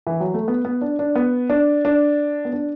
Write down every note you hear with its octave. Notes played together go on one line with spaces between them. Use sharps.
E3
F#3
A3
B3
B3
D4
D4
B3
D4
D4
B3
D4